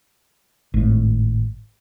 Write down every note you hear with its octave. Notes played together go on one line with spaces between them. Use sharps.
G#1 A2